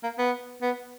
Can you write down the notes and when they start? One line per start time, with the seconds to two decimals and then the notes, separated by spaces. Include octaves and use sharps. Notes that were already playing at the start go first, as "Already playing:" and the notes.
0.03 A#3
0.18 B3
0.62 B3